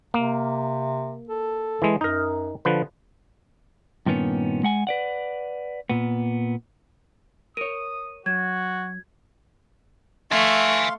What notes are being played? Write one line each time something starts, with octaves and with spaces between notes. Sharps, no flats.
C3 A#3
A4
E3 G#3
F#2 D#4 A#4
D3 F3 B4
G2 A#2 D#3 B3 C#4
G#3 F#5 G#5
B4 D5 F#5
A#2 B3
A#4 C#5 D#6 D#7
F#3 F#4 G#6
A3 E5 F5 G#5 C6 C#6